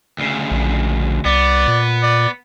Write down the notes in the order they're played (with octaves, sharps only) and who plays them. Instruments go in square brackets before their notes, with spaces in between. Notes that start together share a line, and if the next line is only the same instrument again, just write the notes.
[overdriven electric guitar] D2 C#3
[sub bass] A#1
[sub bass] C2 [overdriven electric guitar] B3 [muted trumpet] D5
[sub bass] A#2
[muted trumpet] D5